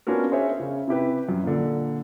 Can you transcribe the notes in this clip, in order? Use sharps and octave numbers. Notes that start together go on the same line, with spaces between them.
B3 C#4 D4 F4 F#4 A#4
G#4 C5 C#5 E5
C#3
C3 E4 G4 B4
F#2
A#2 D3